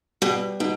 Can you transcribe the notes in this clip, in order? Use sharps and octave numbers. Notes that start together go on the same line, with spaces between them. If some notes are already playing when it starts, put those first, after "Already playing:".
B2 G3
B2 D#4